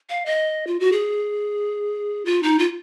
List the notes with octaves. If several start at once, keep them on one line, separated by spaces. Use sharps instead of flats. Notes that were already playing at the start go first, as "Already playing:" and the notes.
F5
D#5
F4
F#4
G#4
F4
D#4
F4